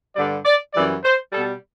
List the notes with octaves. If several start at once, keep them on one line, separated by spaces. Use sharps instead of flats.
G2 D3 G3 D5
D5
F#2 E3 G3 D5
C5
B2 G3 A4